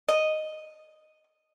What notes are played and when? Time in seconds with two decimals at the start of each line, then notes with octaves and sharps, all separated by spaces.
0.09 D#5